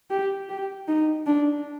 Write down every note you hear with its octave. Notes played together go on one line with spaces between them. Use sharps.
G4
G4
D#4
D4